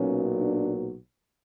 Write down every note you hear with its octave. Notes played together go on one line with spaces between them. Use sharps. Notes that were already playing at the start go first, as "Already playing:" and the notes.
Already playing: B1 A#2 F#3 C#4
D4